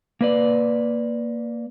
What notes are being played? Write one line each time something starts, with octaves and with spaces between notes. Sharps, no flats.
A#3 B4 D5